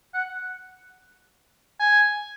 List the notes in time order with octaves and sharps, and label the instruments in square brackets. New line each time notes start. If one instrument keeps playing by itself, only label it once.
[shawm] F#5
G#5